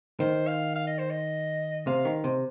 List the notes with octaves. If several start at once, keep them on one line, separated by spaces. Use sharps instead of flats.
D#3 C5
F5
F5
D#5
C5
D#5
C3 F5
D#3
C3